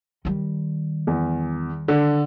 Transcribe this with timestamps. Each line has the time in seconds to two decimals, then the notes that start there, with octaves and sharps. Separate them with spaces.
0.25 D#3 G3
1.07 E2
1.88 D3